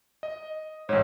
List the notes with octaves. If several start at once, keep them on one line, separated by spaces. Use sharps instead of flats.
D#5
A1 G#2 C#5